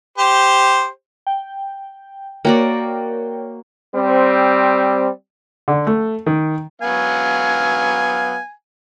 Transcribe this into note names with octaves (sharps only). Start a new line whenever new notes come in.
G4 C5
G5
A#3 F#4 A#4 C#5 D5 G5
G3 C4
D3
A3
D#3
F#3 B3 F5 G#5